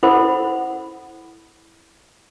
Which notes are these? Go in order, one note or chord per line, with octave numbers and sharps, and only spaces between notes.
E4 A4 C5 F#5 B5